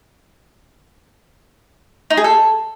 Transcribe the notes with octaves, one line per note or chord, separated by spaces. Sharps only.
D#4
G#4
A4